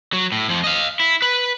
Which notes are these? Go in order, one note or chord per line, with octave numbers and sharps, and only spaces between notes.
F#3
A2
F2 F3
D#5 F5
E4
B4